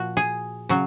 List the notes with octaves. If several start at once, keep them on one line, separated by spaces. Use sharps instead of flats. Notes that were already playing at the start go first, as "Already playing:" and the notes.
Already playing: A#2 F3 F#4
G#4
C#3 F#3